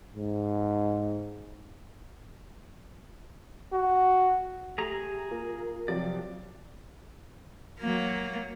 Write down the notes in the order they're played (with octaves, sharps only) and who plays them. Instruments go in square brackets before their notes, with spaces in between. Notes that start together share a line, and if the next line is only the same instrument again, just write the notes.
[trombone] G#2
F#4
[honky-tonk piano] A3 [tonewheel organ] G4 [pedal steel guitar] G#4 A#5
[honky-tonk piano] A#3 [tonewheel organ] F4 A#4
[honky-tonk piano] C3 F3 F#3 [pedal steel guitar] D5
[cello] F#3 A#3